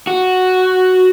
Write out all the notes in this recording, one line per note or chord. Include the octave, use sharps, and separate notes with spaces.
F#4